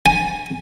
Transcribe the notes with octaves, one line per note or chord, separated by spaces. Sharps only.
G#5